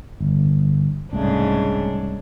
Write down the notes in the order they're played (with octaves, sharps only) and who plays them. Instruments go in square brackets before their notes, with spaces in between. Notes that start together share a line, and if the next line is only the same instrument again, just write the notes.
[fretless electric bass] G1
[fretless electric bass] C2 A3 [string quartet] G#2 C#3 D4